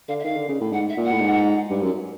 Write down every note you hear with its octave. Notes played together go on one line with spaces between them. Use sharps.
D3 F5
E5
D#3 F5
D3
C#3
A2
G#2 F#5
E5
A#2
F#5
A2
G#2
G2
F#2